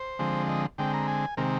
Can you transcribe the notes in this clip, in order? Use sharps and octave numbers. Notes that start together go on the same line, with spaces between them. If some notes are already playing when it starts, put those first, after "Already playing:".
Already playing: C5
D3 F3 G#3 C4
D#5
D3 G#3 C4 G5
A#5
G#5
C3 D#3 G#3 C4 A#4